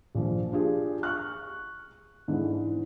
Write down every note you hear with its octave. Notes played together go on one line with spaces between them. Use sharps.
A#1 F3
D4 F4 G4 G#4
C#6 F6 F#6
G#2 D3 E3